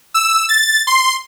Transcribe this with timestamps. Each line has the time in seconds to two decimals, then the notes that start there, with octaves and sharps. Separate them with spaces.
0.14 E6
0.49 A6
0.87 C6